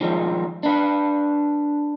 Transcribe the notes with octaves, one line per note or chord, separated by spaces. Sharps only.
D#3 F3 G3 G#3
D4 B4